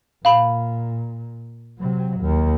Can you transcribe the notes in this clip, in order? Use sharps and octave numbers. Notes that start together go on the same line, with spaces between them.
A#2 F5 B5
C3 F#3
D#2